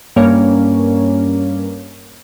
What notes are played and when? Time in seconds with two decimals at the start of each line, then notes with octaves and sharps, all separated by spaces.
0.16 G2 A#3 C#4